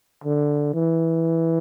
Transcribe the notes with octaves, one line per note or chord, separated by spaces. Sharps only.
D3
E3